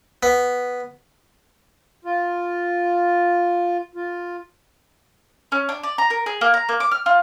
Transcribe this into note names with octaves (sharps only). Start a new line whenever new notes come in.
B3
F4
F4
C#4
D4
D5
A#5
A#4
G#4
A#3
A#5
A#3
D6
F6
F4